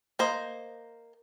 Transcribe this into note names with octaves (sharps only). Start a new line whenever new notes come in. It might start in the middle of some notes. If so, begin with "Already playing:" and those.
A#3 C5 D#5